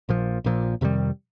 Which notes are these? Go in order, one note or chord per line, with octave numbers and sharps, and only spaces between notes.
A#1 A#2 F3
A#1 A#2 F3
F2 C3 D#3 G3